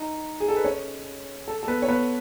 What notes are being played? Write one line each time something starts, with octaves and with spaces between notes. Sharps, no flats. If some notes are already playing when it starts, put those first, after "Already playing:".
Already playing: D#4 D#5
G#4
A4
B4
C#4 C#5
A4
A4
B3 B4
C#5
B3 B4